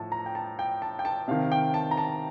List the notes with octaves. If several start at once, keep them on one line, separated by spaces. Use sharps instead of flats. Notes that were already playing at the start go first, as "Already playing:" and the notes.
Already playing: A2 F3 A5
A#5
G5
A5
G5
A5
G5
A5
C3 D#3 F5
G5
A5
A#5
A5